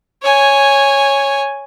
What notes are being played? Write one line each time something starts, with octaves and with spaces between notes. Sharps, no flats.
C#5 G#5